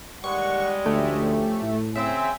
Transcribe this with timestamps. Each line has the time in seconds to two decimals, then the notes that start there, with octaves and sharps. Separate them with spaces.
0.24 D#2 E3 G3 G#3 F#5 C#6
0.86 D2 F3 A3 C#4 G4
1.62 A2
1.96 C#3 C4 E5 G#5